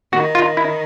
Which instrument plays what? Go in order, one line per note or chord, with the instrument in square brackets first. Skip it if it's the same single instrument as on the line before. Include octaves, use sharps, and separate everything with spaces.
[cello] D#3 [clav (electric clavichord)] F#4
[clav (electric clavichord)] F4
E4